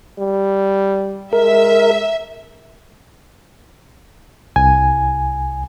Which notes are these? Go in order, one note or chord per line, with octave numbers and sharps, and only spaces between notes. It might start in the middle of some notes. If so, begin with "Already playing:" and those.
G3
G#3 A#4 E5
C2 G#5